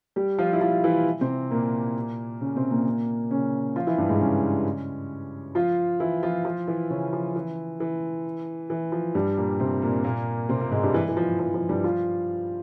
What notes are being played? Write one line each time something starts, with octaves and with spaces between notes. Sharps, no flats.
G3 G4
F3 F4
E4
F3 F4
E3 E4
C3 C4
A#2 A#3
C#3 C#4
C3 C4
A#2 A#3
C#3 C#4
F3 F4
E3 E4
G2 G3
G#2 G#3
C#3 C#4
F3 F4
E3 E4
F3 F4
F3 F4
E3 E4
C#3 C#4
F3
E3
E3
E3
F3
G2 G3
A#2 A#3
C3 C4
A#2 A#3
A#2 A#3
C3 C4
A#2 A#3
G#2 G#3
G2 G3
E3
E3
F3
F3
F3
G2 G3
F3 F4